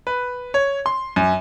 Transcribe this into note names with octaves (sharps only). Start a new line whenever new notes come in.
B4
C#5
C6
F#2